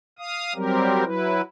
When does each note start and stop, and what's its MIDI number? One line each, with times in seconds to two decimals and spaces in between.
0.19 0.53 77
0.19 0.53 87
0.55 1.04 54
0.55 1.04 55
0.55 1.04 60
0.55 1.04 67
0.55 1.04 70
1.05 1.41 54
1.05 1.41 64
1.05 1.41 71